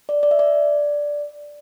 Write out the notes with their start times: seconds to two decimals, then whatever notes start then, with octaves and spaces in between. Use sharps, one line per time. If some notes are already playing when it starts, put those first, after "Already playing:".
0.09 D5
0.23 D5
0.31 E5
0.39 D5